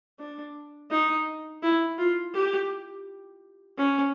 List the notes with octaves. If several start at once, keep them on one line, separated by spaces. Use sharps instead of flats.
D4
D#4
E4
F4
G4
C#4